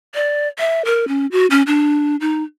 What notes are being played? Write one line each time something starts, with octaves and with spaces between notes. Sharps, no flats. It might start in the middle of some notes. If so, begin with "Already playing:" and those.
D5
E5
A#4
C#4
F#4
C#4
D4
D#4